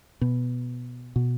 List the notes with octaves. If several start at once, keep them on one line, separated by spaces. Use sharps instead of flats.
B2
B2